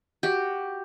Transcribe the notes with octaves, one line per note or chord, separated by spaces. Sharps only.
F#4 G4